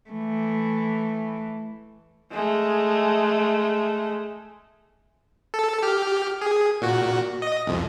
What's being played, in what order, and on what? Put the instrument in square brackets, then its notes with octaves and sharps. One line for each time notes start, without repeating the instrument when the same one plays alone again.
[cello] E3 A3
[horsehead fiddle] G#3 A3
[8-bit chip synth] A4
G4 F6
G#4
A#2 F#4
D#5
C2 F2